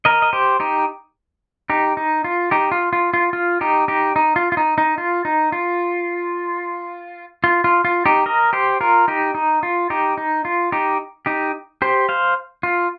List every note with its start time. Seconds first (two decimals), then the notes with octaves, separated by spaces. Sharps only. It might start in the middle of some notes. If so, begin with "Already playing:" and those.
0.05 A#4 D#5
0.22 D#5
0.33 G4 C5
0.60 D#4 G4
1.70 D#4 G4
1.97 D#4
2.24 F4
2.51 D#4 G4
2.72 F4
2.93 F4
3.14 F4
3.33 F4
3.61 D#4 G4
3.88 D#4 G4
4.16 D#4
4.36 F4
4.52 F4
4.57 D#4
4.78 D#4
4.98 F4
5.25 D#4
5.52 F4
7.44 F4
7.64 F4
7.85 F4
8.06 D#4 G4
8.26 A#4 D#5
8.53 G4 C5
8.81 F4 A#4
9.08 D#4 G4
9.35 D#4
9.63 F4
9.90 D#4 G4
10.18 D#4
10.45 F4
10.72 D#4 G4
11.26 D#4 G4
11.82 G4 C5
12.09 C5 F5
12.63 F4